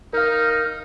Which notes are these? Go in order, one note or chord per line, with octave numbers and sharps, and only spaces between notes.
D#4 A#4 F5 F6